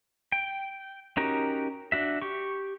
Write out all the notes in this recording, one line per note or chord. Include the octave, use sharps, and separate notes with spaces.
G5
C#4 D#4 F#4 G4 A#4
D4 F#4 E5
G4 C#6